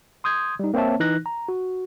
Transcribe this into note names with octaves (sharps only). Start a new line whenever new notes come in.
C6 D#6 G6 G#6
G3 D#4
A#3 C4 C5 C#5 E5 A5
E3 D#4 F#6 A#6
A#5
F#4